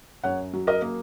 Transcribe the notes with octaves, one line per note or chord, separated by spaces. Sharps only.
F#2 C#5 F#5
F#3
A#4 D#5
A#3